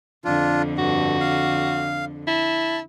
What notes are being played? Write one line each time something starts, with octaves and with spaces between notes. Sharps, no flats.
F2 D3 D4 F4
G2 F#4
F5
E4 A5